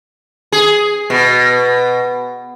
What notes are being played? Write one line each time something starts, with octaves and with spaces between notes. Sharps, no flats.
G#4
B2